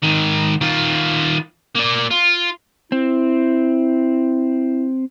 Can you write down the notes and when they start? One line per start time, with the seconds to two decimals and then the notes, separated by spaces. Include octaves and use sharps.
0.03 G#2 D#3
0.61 D#3 F4
1.75 A#3 D5
2.11 F4
2.92 C4 E4